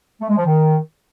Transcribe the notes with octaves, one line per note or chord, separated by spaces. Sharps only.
A3
G#3
F3
D#3